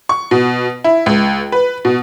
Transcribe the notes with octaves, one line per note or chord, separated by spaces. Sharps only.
C#6
B2
E4
C#2
B4
B2